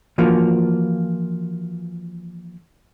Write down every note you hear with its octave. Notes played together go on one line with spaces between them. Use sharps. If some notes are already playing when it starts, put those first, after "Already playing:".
E3 F3 A#3 F4 F#4